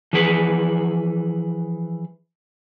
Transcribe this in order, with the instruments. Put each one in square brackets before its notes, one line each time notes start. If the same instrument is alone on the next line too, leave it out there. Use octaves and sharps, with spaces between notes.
[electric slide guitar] E3 F3 G#4 B4